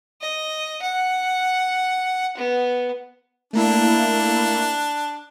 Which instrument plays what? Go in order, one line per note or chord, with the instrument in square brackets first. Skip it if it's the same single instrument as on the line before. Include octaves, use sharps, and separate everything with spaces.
[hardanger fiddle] D#5
F#5
B3
[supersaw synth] A3 A#3 E4 [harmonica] D4